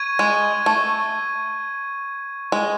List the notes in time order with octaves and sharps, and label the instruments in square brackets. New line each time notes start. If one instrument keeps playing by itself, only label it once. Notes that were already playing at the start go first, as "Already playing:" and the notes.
Already playing: [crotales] C#6 G#6 D#7
[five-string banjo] G#3
A3
G#3